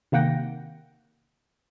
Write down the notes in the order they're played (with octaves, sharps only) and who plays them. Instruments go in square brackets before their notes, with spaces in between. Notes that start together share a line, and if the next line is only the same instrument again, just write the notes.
[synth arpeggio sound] C3 D#3 A#3 F#5 G5 A#6